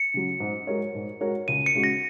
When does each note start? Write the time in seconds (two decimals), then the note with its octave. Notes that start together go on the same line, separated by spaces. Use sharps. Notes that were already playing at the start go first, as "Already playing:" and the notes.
Already playing: C#7
0.14 C#3 F#3
0.40 G#2
0.67 G#3 F#4 A#4 C#5
0.95 G#2
1.21 G#3 F#4 A#4 C#5
1.48 C#2 D#7
1.66 C#7
1.75 C#3 G#3 F#4
1.84 A#6